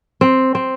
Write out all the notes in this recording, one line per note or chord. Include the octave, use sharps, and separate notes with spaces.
C4
C4